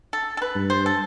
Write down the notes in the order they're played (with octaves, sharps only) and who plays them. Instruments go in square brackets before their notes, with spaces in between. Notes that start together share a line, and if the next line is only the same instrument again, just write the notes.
[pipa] A4
A4
B4
[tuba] G2
[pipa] C5
A4